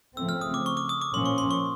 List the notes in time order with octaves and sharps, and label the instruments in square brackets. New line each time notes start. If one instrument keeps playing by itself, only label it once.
[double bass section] C#3 F3 A3 C4 [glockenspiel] E6
[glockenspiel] F6
D#6
D6
C#6
D6
D#6
D6
[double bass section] A#2 F3 A#3 C#4 [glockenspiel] C6
[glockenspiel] C#6
C6
C#6